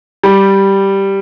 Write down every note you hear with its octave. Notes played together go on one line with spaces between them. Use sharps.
G3